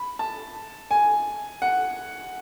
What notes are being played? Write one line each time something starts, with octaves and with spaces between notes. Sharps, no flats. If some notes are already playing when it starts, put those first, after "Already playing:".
Already playing: B5
A5
G#5
F#5